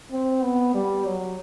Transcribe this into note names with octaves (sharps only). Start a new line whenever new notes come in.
C4
B3
G3
F#3